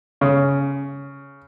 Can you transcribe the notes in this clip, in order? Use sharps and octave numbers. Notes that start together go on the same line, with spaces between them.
C#3